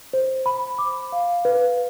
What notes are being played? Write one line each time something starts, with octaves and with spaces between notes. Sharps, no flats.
C5
B5
D6
F5
B4